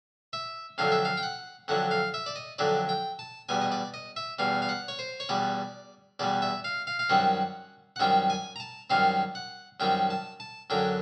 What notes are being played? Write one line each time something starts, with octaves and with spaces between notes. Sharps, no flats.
E5
F2 D3 F#3 F5
E5
F5
G5
F#5
F2 D3 F#3 F#5
F5
E5
D5
D#5
F2 D3 F#3 D5
G5
A5
E2 B2 G3 G#5
D#5
D5
D#5
E5
E2 B2 G3 F5
F5
F#5
C#5
C5
C#5
E2 B2 G3 D5
E2 B2 G3 D5
E5
F5
F5
F5
F#2 D#3 G3 C4 F#5
F#5
F#2 D#3 G3 C4 G5
G#5
A#5
A5
F#2 D#3 G3 C4 F5
F#5
F#2 D#3 G3 C4 G5
A5
A5
F#2 D3 F#3 G5